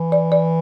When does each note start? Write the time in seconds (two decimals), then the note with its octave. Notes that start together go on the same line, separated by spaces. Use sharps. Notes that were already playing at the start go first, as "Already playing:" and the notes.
Already playing: E3
0.12 D5
0.32 D5